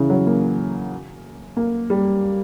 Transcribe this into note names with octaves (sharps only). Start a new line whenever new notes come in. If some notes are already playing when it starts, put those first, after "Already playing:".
Already playing: C#3 E3
F#3
A#3
A#3
G3